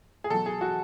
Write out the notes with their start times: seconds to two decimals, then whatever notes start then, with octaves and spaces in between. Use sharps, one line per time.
0.24 G#4
0.30 B2 F#3 A4
0.46 G#4
0.61 F#4